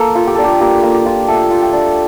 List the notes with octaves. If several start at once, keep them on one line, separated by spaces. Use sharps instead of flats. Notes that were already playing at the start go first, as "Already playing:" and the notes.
Already playing: A#3 A4
F4
G4
D4 A4
G4
A#3 G4
A#3
G4
F4
A3 A4
F4
G5
D4